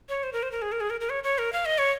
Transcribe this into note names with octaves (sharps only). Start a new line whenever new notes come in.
C#5
C5
A#4
C5
A#4
G#4
A#4
G#4
A#4
A#4
C#5
C#5
A#4
F5
D#5
C#5